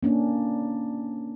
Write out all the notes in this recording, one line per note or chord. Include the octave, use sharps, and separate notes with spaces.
A#3 C#4 D4